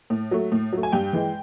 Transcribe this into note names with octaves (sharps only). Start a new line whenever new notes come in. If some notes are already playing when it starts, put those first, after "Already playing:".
A2
F#3 A3
A2
F#3 A3
G#5
G2 G5
E3 G#3